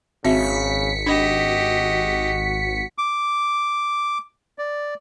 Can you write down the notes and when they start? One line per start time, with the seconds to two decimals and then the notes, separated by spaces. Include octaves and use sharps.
0.24 G#1 C#3 C4 F#4 E5 B6 C#7
1.06 D4 F#4 G4 D#5
2.98 D6
4.58 D5